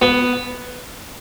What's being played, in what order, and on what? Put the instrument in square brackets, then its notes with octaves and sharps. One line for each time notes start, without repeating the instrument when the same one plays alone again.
[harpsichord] B3